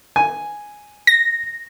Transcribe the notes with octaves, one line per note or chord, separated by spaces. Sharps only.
G#5
A#6